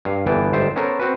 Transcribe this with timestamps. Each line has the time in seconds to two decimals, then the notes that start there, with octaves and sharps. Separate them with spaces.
0.05 G2 F5
0.26 G1 G2 E3 B3 G5 A5
0.52 G1 G#2 C5 E5 G5 A5
0.76 B3 C#4 A4 A#4 C5
0.99 C4 F#4 B4